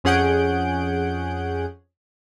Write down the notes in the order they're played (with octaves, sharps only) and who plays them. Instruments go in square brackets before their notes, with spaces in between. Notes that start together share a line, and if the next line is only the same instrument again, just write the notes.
[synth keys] F2 C#4 G#4 F#5 G6 D7